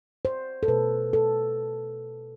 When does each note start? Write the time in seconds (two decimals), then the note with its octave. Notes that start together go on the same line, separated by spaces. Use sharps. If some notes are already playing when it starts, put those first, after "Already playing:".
0.25 C5
0.63 A4
0.68 B2 A3 B4
1.13 A4